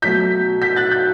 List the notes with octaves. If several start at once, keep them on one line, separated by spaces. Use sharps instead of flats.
B2 F#3 A3 G6 B6
G6 B6
F#6 A6
G6 B6